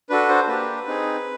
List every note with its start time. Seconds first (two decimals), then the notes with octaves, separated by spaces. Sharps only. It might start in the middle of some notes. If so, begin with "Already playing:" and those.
0.10 D4 F#4 A4 B4
0.29 C5
0.48 A#3 D4 G4 B4
0.87 C4 D#4 G#4